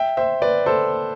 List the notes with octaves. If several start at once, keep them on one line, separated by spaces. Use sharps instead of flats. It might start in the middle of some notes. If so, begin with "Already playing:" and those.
Already playing: E5 G5
C5 E5
B4 D5
A4 C5